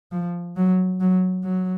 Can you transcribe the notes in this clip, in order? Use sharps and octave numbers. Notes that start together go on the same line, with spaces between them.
F3
F#3
F#3
F#3